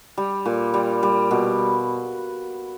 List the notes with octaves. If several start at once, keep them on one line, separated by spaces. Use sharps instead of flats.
G3
A#2
G3
G3
B2